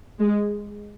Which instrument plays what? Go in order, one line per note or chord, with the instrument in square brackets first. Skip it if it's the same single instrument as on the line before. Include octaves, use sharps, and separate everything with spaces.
[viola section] G#3